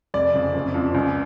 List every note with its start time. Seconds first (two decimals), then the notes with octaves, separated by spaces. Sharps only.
0.14 F1 D5
0.34 F2 C#3
0.54 F#1
0.74 F2 F3
0.94 C#2